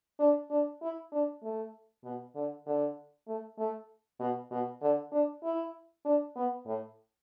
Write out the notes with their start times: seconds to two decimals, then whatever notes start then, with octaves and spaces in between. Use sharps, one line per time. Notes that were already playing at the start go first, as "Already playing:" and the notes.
0.20 D4
0.50 D4
0.82 E4
1.12 D4
1.43 A3
2.04 B2
2.35 D3
2.66 D3
3.28 A3
3.59 A3
4.20 B2
4.51 B2
4.82 D3
5.12 D4
5.43 E4
6.05 D4
6.36 B3
6.66 A2